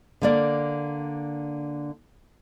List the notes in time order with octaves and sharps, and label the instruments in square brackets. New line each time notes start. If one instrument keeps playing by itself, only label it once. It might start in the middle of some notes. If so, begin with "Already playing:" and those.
[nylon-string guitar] D3 A#3 D5